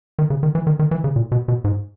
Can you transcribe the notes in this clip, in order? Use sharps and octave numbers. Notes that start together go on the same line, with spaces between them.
D#3
C#3
D#3
E3
D#3
D#3
E3
C#3
A#2
B2
B2
G#2